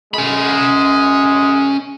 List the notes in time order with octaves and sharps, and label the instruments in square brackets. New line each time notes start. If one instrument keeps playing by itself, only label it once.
[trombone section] F#2 G#3 [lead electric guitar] C#4 B5